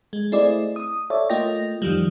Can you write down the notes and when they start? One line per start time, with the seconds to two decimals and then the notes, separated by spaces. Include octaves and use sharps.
0.13 G#3
0.32 A3 C4 E4 G#4 D5 D#5
0.76 D#6
1.10 A4 C#5 D5 E5
1.30 A3 A#3 F4 D#5 G5 A#6
1.82 F2 D#3 F3 G3